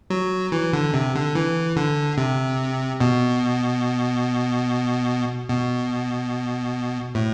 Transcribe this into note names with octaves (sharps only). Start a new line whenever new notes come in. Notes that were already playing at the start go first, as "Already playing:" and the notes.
F#3
E3
D3
C3
D3
E3
D3
C3
B2
B2
A2